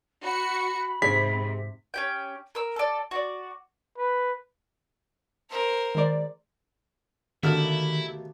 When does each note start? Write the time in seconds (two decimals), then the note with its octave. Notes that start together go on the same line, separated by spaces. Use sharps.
0.24 F#4 B5 C#7
1.02 G#2 C3 G#4 B6
1.94 C#4 G4 G5
2.55 A#4 E6
2.76 A4 D5
3.11 F#4 D5
3.98 B4
5.50 A#4 C5
5.95 D#3 G#3 D5
7.43 D#2 B2 D3 D#3 A3 E4 F6